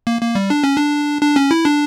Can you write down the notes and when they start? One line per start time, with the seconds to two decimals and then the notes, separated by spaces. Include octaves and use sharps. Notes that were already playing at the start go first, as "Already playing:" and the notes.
0.07 A#3
0.21 A#3
0.35 G3
0.50 D4
0.64 C#4
0.77 D4
1.22 D4
1.36 C#4
1.51 E4
1.65 D4